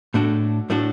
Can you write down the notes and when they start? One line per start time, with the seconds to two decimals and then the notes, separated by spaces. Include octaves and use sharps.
0.14 A2 A3 D4 F#4 A4
0.70 A2 A3 D4 F#4 A4